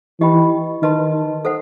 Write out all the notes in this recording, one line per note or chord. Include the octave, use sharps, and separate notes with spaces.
E3 D#4 G4 D#5 G5 B5
D#3 B4 D#5 A5 C6
A4 C5 F#5